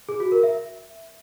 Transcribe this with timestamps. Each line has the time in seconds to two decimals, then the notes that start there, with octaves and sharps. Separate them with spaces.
0.09 G#4
0.20 F#4
0.32 A#4
0.43 E5